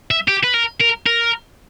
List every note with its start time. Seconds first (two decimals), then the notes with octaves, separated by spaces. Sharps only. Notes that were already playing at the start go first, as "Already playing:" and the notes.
0.11 E5
0.28 G4
0.43 B4
0.53 A#4
0.80 A#4
1.06 A#4